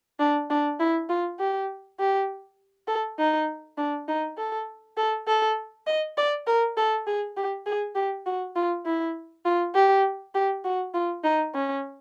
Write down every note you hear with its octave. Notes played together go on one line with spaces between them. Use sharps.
D4
D4
E4
F4
G4
G4
A4
D#4
D4
D#4
A4
A4
A4
D#5
D5
A#4
A4
G#4
G4
G#4
G4
F#4
F4
E4
F4
G4
G4
F#4
F4
D#4
C#4